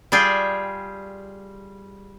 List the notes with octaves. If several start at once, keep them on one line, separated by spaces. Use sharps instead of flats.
G3 F4 G#4 G5